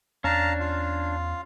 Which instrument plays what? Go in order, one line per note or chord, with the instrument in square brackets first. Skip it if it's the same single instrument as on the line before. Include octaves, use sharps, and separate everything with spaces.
[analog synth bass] E2 [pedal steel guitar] C#4 D4 [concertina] F5 A5 A#5
[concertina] F4 F5